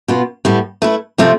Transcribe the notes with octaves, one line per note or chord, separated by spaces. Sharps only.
B2 B3 F4
A2 G3 B3
A3 E4 B4
C3 F3 A3 C4 F4